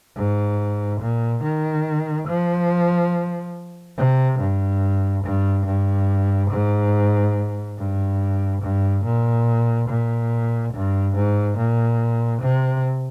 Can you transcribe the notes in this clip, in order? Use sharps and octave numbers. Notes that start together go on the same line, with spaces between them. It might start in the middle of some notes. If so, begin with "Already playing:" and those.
G#2
A#2
D#3
F3
C3
G2
G2
G2
G#2
G2
G2
A#2
A#2
G2
G#2
A#2
C3